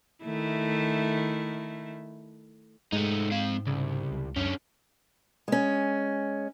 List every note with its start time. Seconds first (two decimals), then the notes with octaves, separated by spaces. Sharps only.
0.24 D#3 A3 E4
2.92 G#2 G#3 A3 D#4
3.31 C4 F5
3.67 C2 C#3
4.11 C#2
4.36 F#2 D3 C#4
5.48 G#3 C#4